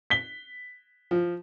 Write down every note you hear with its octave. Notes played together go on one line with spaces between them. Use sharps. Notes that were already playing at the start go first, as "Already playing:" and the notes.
B6 G7
F3